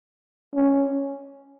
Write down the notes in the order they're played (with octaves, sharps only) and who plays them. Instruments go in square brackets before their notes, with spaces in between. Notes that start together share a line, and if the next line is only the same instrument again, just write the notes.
[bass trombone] C#4